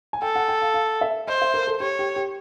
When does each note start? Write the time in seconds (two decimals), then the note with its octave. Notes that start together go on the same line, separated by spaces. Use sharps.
0.13 G#5
0.22 A4 G5
0.36 F#5
0.48 G5
0.62 F5
0.74 F5
1.01 E5
1.27 C5 D#5
1.42 E5
1.54 A#4
1.67 A4
1.80 G4 C#5
1.99 G4
2.16 G4